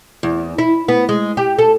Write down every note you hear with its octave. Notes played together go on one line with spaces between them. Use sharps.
E2
E4
B3
G#3
G4
A4